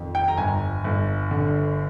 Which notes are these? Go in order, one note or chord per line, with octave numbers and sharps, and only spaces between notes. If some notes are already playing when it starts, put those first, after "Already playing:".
Already playing: F2 D#3
G5
A#5
G1 G#5
G1
D3